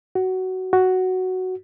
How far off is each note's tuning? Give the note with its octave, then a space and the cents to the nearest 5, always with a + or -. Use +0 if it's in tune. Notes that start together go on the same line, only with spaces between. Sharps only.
F#4 +15
F#4 +5